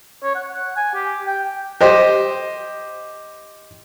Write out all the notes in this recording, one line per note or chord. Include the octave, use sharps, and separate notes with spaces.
C#5
F#5
F#5
G#5
G4
G5
G4 C5 D#5